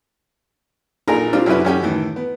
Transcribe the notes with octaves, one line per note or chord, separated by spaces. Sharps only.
A#1 A#2 D#4 G#4 A#4 A#5
G3 C4 D4 F4
F#2 C3 C#4 E4 B4
F#2 C#4 G4
A2 D#3 E3
B3